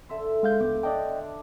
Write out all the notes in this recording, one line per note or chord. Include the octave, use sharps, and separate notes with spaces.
D3 E5 C6
G#3 F5 G6
C#2 B3 G5 D6
D4 D5 D#5 G5